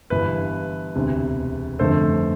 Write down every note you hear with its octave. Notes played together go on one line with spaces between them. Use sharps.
G1 G2 E3 B4
E1 D2 C3
G1 F2 D3 A3 A4 C5